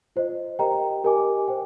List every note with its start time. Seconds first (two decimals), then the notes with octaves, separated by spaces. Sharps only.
0.16 F4 C5 D#5
0.59 G4 A#4 D#5 G5 A#5
1.04 G4 A#4 D#5 G#5 D6
1.48 C5 G5